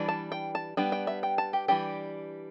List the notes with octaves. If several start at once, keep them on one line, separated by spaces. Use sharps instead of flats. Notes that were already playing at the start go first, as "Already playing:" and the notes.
Already playing: E3 G3 D4
A5
G5
A5
G3 B3 D4 G5
G5
E5
G5
A5
G4
E3 G3 D4 G4